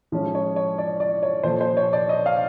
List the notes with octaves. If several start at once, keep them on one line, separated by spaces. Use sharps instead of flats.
A2 F3 G#3 C#4
C#5
C#5
D5
D5
C#5
A#2 F3 A3 C5
C5
C#5
D5
D#5
F5